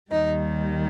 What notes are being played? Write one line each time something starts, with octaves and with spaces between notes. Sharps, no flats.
D#2 D#3 G3 D#4